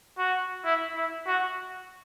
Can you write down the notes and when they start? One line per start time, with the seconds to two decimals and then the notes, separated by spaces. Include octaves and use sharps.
0.19 F#4
0.65 E4
0.96 E4
1.27 F#4